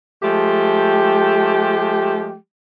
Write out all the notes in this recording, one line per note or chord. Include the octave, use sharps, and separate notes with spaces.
F3 G#3 A3 G4